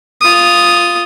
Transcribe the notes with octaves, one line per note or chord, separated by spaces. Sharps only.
F4 D#6